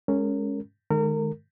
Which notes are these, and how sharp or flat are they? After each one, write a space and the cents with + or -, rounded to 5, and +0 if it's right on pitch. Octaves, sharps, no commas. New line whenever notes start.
G#3 +0 C#4 +0 A#4 -20
D#3 -25 G#3 +25 A#4 -30